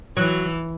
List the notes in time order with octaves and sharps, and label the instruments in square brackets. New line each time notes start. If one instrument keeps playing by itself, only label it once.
[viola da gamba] E3 [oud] F#3